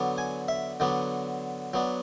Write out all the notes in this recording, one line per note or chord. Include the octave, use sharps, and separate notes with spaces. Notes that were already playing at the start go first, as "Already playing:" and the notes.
Already playing: D3 F#3 B3 D4
G#5
E5
D3 F#3 B3 D4
F#3 B3 D4